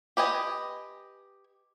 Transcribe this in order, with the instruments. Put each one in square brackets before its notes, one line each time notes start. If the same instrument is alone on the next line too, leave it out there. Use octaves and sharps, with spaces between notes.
[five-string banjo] G4 B4 D#5 G#5